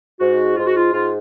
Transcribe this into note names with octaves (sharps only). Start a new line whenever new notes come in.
G#2 F#4
G#2 F4
F#4
F4
G#2 F4